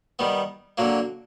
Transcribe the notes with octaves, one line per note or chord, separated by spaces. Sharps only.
D#3 G3 B3
D3 F#3 A#3